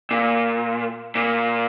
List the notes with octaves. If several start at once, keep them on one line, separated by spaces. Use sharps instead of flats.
A#2
A#2